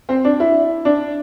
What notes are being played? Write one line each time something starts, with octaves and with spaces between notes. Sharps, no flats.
C4
D4
E4
D4